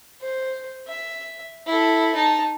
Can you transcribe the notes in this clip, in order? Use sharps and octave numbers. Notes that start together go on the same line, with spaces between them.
C5
E5
E4 A4
D#4 A5